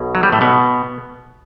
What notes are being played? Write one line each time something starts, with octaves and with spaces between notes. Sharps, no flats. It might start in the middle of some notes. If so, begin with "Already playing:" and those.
Already playing: B1 B2
F#3
G3
A2 A3
B2 B3